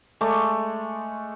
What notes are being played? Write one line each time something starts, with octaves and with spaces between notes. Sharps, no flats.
G#3 A3 D5 C#6